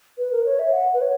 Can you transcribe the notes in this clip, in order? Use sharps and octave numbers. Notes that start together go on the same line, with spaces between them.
B4
A#4
B4
C#5
E5
F#5
B4
C#5